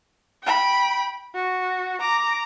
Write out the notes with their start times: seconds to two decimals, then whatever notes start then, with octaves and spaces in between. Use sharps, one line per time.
0.43 G5 B5
1.35 F#4
2.01 A#5 D6